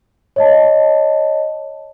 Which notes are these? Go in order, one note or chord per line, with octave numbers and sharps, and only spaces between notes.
C#5 D#5 A5